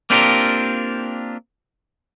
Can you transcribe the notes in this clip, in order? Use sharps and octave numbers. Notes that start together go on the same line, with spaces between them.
A#3 C4 D4 F4 G4 A#4